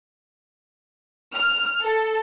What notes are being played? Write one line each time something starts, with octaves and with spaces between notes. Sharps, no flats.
F6
A4